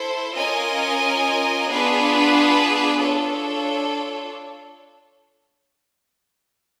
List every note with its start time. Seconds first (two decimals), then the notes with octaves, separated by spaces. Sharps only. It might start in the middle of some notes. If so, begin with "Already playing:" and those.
Already playing: E4 A4 C5
0.35 C#4 F4 A#4 D#5 G#5
1.68 B3 D4 F4 G#4 B4
3.00 D4 F4 A4 C#5